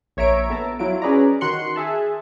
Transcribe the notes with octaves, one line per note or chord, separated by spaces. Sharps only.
A#1 C#5 E5 A#5 D7
B3 A4 E5 A5 A#5
F#3 E4 F4 D7
C#4 G#4 B4 D5 A#5
D#3 F#4 C6 F#6 C#7
G#4 E5 A5